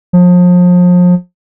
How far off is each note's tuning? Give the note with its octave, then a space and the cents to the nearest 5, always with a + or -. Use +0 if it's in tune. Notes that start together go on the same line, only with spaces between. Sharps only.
F3 +35